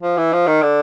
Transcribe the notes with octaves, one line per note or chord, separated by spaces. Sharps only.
F3
E3
F3
D#3
D3